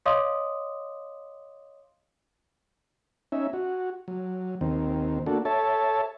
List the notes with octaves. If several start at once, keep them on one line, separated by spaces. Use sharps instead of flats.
C#5 D#5 F5 C6 D6 D#6
C#4 D#4 E5
F#4
F#3
D#2 D#3 C4
A#3 D4 F#4 A4
A4 C#5 E5 A5